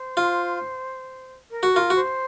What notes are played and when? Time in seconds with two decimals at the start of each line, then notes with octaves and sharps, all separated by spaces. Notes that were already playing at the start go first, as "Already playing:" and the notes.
Already playing: C5
0.17 F4
1.51 A#4
1.63 F#4
1.73 F4 A#4
1.90 F#4
1.95 C5